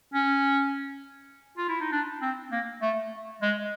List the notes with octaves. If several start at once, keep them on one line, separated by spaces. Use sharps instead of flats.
C#4
F4
E4
D#4
D4
C4
A#3
A3
G#3